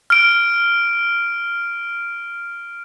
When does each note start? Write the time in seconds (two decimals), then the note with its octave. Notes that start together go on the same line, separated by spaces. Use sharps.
0.10 F6 D7